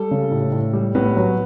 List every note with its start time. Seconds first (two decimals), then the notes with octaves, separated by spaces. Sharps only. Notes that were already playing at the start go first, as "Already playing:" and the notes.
Already playing: G3 A4
0.11 C#3
0.31 A2
0.52 A2
0.73 G3
0.95 A2 B3
1.16 F#3